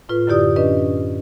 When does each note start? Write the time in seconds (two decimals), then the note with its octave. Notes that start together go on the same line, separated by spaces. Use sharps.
0.09 A2 F4 B4
0.27 F#2 D3 E4 G4 D5 D#6
0.56 C#4 D4 B4 D#5